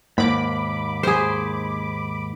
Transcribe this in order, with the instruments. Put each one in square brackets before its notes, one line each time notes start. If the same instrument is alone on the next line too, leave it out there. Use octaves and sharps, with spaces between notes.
[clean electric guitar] D#2 G#2 [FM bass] A#3 [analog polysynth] B5 D6
[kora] G#4 C5